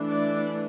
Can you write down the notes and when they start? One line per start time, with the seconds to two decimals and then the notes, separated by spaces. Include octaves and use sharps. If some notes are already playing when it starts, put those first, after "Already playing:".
Already playing: E3 A3 D4
0.09 D5